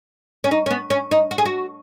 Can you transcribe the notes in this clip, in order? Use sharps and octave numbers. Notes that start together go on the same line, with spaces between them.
C#4
D#4
C#4
B3
C#4
D#4
F#4
G#4
F#4